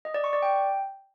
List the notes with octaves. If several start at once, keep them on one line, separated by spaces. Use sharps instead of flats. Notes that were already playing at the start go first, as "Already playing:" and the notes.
D#5
D5
C#6
D5
G5